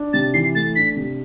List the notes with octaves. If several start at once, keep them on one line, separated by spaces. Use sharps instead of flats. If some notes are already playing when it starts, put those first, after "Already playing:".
Already playing: D4
C3 A6
E3 C7
A3 A6
D4 B6
C3